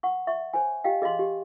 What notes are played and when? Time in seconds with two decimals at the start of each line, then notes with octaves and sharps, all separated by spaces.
0.03 F#5 C#6
0.27 E5 C#6
0.53 C5 C#5 G#5
0.84 G4 D#5 F5 G5
1.02 G#4 D#5 F5 C6
1.19 G4